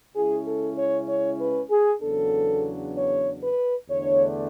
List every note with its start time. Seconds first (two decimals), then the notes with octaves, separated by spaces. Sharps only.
0.15 C#3 G#3 C#4 E4 G#4
0.45 A4
0.77 C#5
1.08 C#5
1.39 B4
1.71 G#4
2.01 E2 C#3 F#3 B3 D4 A4
2.96 C#5
3.42 B4
3.90 E2 D3 A3 D4 C#5